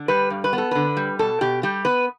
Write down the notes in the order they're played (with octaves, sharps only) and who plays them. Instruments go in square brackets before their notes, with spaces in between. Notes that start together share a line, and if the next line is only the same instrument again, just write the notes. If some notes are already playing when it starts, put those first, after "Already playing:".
Already playing: [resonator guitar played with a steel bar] D3
G3 B4
G2
B4
B3
A4
D3 B4
G3
B2 A4
B2 G4
G3 G4
B3 B4